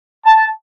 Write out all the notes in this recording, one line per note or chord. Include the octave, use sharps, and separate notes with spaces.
A5